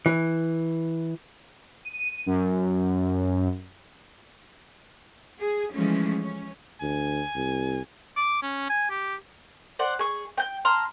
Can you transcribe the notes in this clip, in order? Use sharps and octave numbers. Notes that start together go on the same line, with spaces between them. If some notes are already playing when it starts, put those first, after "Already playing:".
E3
D#7
F#2
G#4
E3 F3 G#3 A3 C#4
C#4
D2 G#5
C2
D6
C#4
G#5
G4
C5 D5 F#5
G#4 C#6
G5 G6
A5 A#5 C6 F6